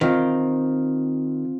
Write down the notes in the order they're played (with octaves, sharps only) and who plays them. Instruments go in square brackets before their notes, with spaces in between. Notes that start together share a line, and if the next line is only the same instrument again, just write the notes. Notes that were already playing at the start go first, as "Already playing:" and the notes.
[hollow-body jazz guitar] D#3 [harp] C4 F4